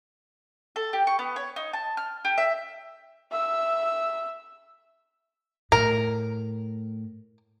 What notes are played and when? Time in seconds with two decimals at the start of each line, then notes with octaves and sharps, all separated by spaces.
0.76 A4
0.93 G4
1.07 C#6
1.19 B3
1.36 C#5
1.56 D#4
1.73 A5
1.97 F6
2.25 G4
2.38 E5
3.31 E5 E6
5.72 A2 A#4